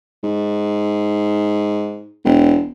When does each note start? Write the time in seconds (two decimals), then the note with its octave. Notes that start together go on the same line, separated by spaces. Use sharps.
0.23 G#2
2.25 E1